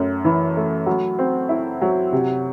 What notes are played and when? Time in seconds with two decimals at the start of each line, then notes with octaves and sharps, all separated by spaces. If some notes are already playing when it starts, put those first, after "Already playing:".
Already playing: F#2 A3
0.25 E3
0.56 A3
0.86 F#3
1.19 C4
1.49 E4
1.81 F#3
2.12 C3